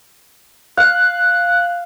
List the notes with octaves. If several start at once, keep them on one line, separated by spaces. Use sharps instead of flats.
F5 F#6